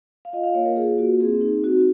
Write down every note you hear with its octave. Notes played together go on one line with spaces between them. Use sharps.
F5
F4 D#5
F5
A#3 C#5
A#4
F4 G#4
A#3 F#4
C4 G#4
D#4
C4 F#4